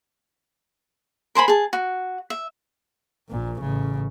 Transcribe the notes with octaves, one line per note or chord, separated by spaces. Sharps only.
A#4 C5 G#5 B5
G#4 A5
F#4
E5
A#1 A#2
A1 C#3